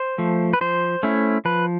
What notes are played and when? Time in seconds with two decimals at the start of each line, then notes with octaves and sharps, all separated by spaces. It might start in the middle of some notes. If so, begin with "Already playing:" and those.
Already playing: C5
0.18 F3 A3
0.53 B4
0.61 F3 C5
1.03 A3 C#4 E4
1.45 F3 B4